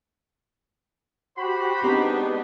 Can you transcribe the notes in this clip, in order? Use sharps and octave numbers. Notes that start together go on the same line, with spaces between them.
F#4 G4 C5 B5
G#3 B3 C4 D4 D#4 G4 A#5